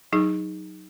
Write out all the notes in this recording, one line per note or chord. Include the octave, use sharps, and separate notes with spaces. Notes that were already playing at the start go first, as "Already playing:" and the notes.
F#3 D#4 G#4